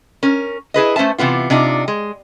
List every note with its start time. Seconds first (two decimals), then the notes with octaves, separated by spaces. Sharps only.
0.23 C#4 A#4
0.74 E4 G#4 B4 D#5
0.96 A3 C#4 C5 E5 A5
1.18 C3 E3 B3 F4
1.50 C3 D4 D#4 F4
1.88 G#3